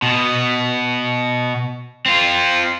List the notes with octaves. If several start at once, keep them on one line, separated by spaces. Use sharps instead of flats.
B2
C4 F4